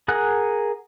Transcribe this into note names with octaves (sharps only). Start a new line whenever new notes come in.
G#4 A#4 F#5 G#5 F#6